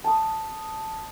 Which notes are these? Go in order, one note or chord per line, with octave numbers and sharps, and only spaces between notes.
A5 D#6